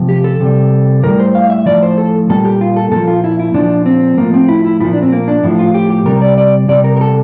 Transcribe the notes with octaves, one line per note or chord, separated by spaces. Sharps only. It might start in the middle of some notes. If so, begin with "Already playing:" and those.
Already playing: C3 F3
G4
A4
C3 G3
A2 E3 G3 A#4
C5
F5
E5
A2 F3 D5
C5
A4
A#2 G3 A4
G4
F4
A4
A#2 F3 A4
F4
E4
E4
A#2 F3 D4
C4
A2 F3 A#3
C4
E4
E4
A#2 F3 E4
D4
C4
A#3
D4
A2 F3 E4
F4
G4
G4
C3 G3 A#4
D5
D5
C3 G3 D5
A#4
A#4
A4